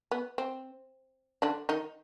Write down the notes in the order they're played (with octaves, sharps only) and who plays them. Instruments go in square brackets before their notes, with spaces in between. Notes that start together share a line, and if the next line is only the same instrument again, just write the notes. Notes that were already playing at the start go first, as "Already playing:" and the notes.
[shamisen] B3
C4
D3 D4
D#3 D#4